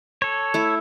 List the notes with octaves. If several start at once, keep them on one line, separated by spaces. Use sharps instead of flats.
A4 C#5
A3 E4